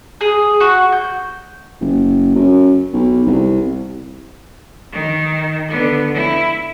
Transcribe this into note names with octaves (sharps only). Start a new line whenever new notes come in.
G#4
F#4
G6
F#1
F#2
B1
C2
D#3
D3 B3
E4